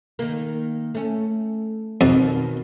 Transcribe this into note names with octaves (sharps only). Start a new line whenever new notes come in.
D#3 A#3
A3 C#4
F2 B2 D#3